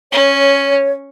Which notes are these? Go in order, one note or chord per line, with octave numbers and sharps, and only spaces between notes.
C#4 C#5